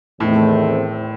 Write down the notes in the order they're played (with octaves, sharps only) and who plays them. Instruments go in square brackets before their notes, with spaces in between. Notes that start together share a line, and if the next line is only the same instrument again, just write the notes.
[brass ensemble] E2 D#3 A3 C4 [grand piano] A2